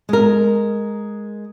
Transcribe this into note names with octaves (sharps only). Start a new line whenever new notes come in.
G#3 A#4